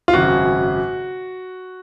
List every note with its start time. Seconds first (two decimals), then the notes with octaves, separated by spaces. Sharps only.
0.08 F4
0.13 G#1 F#2 C#3 F#4